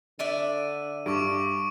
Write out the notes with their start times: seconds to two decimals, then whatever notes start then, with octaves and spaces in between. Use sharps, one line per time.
0.19 D3 D4 D5 E5 D#7
1.06 G2 C#6 D6 D7